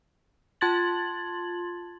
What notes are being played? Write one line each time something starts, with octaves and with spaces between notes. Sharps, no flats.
F4 A5 C6 G#6 A6 F#7